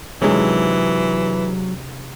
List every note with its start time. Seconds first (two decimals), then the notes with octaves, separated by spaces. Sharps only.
0.22 C3 D#3 E3 F#3 G#3 C#4 D4 G#4